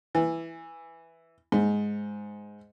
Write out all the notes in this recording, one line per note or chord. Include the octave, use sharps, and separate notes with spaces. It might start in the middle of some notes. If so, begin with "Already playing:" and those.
E3
G#2